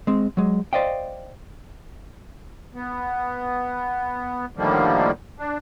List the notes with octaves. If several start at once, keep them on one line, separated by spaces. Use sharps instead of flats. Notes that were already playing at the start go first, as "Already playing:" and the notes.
G#3 C4
F#3 G#3
C5 D5 D#5 F5 G5
B3
A2 D3 D#3 F3 G3 A#3
D4